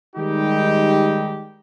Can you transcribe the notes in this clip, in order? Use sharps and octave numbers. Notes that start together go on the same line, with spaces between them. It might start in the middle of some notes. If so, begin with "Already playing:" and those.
D#3 G3 G#3 D#4 G4